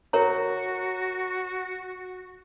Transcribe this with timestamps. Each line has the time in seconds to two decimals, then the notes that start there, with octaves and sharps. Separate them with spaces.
0.13 F#4 A#4 C#5 A#5